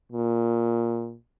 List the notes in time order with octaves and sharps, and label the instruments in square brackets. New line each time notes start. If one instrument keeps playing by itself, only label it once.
[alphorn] A#2